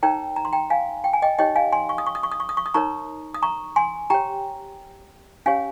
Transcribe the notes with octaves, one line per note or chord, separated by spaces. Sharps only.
D#4 A#4 C#5 G5 A#5
A#5
C6
G5 A#5
F5 G#5
G5
G#5
D#5 G5
D#4 G4 C#5 D#5 G5
F5 G#5
G#5 C6
C#6
D#6
C#6
D#6
C#6
D#6
C#6
D#6
C#6
D#6
D#4 A#4 C#5 A#5 C#6
D#6
A#5 C#6
G#5 C6
G4 C#5 G5 A#5
C#4 G4 C#5 F5 G#5